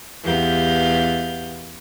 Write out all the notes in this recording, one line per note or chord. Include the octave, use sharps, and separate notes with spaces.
E2 B3 G4 F5 G6